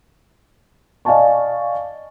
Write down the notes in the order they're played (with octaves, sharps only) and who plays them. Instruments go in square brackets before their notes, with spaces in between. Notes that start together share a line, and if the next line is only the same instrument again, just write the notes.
[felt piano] D5 D#5 F5 G#5 A5 C#6